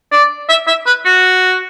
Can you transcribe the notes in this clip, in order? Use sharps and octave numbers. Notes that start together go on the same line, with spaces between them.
D5
E5
E5
B4
F#4